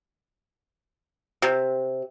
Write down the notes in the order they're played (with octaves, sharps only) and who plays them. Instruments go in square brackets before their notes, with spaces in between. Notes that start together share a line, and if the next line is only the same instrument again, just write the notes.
[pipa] C3